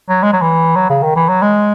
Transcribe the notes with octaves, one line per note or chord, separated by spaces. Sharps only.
F#3
G#3
F#3
E3
F#3
C#3
D#3
E3
F#3
G#3